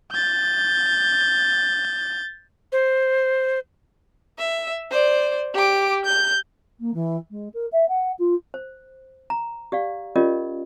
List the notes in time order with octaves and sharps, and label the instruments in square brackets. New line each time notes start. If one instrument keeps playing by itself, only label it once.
[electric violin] G6 A6
[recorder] C5
[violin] E5
C5 D5
G4 D6
G6
[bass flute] A#3
E3
G#3
A#4
E5
F#5
F4
[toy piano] C5
A#5
G4 D5 F5
C#4 F4 G4 A#4 D5 D#5